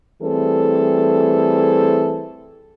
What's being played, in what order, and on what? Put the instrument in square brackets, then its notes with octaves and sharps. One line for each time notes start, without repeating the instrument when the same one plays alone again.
[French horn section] E3 G3 A3 C4 G#4 A4